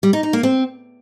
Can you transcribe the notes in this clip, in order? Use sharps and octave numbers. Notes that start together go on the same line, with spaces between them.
G3
D#4
D#4
A#3
C4